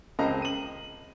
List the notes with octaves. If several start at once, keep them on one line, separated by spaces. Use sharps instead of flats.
C#2 C4 A#4 D#5 A5 A#5
D#7 F#7